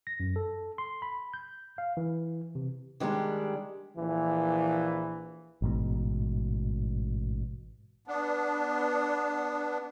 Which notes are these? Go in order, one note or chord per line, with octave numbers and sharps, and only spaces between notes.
A#6
F#2
A4
C6
B5
G6
F5
E3
C3
D#3 E3 G3 G#3 D4
A#1 E3
A1 G#2 B2
B3 D4